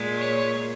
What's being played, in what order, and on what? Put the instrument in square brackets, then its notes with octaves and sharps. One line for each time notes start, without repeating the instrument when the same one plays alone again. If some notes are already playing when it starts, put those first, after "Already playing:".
Already playing: [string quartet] A#2 G#3
C#5